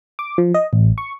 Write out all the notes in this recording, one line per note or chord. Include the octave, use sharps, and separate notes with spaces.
D6
F3
D#5
A1
C#6